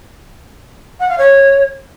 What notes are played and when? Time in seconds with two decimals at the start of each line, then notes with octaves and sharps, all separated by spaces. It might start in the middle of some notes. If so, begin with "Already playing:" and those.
1.00 F#5
1.09 F5
1.18 C#5